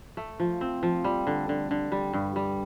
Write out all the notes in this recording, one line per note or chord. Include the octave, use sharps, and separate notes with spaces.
A3
F3
C4
F3
G3
D3
D3
D3
G3
G2
G3